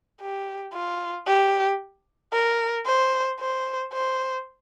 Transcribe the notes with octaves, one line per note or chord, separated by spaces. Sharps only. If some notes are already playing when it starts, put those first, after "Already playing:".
G4
F4
G4
A#4
C5
C5
C5